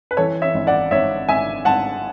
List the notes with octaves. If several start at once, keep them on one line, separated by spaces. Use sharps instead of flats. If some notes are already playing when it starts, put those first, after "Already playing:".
B4
E3 A4 C#5
C#5 E5
G#1
D5 F#5
G#1 C#5 E5
G#1 E5 G#5
G#1 F#5 A5